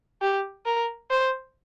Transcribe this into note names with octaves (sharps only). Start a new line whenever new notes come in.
G4
A#4
C5